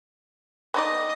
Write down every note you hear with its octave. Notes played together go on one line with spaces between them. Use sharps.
B3 D#4 D5 D#5